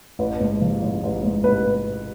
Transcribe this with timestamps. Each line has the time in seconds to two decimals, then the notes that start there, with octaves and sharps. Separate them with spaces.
0.19 A1 B4
0.40 G#2
0.61 F3
0.82 A1
1.03 A1
1.23 G#2
1.44 A1 B4